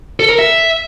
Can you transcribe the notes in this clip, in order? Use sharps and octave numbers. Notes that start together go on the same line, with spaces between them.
A4
A#4
E5